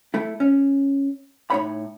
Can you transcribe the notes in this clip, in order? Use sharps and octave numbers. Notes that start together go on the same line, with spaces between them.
A3 E4
C#4
A2 D#4 C#5 B5